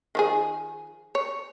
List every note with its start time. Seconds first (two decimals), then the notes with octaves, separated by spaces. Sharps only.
0.15 D#3 F3 G#4
1.15 C#5